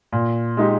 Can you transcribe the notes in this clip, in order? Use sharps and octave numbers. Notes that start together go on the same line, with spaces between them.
A#2
G#3 D#4 G4